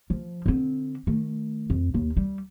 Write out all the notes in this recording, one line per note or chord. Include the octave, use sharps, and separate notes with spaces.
F3
D3 C4
D#3 A3
F2
D#2
G3